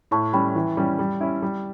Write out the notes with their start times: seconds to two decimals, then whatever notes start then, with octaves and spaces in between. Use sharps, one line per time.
0.11 A2 A5 C#6
0.33 G3 C#4 G5 B5
0.55 E3
0.77 G3 C#4 G4
0.99 G3
1.21 C#4 E4
1.43 G3